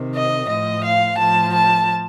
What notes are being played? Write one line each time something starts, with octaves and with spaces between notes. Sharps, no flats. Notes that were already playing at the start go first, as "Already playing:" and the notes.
Already playing: C3 D#3
D#5
A2 F3 D#5
F5
A2 F3 A5
A5